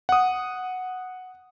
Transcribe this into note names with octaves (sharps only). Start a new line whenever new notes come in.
F#5 D#6